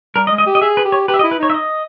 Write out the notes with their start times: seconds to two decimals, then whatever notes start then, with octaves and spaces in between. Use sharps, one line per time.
0.16 G3 A#4
0.27 D#5
0.31 G#3
0.38 D#5
0.46 G4
0.55 D#5
0.61 G#4 E5
0.77 B4
0.85 G4
0.92 C#5
1.08 G4 B4
1.14 E5
1.19 D#5
1.24 E4
1.31 B4
1.39 D#4 C#5
1.50 E5
1.54 D#5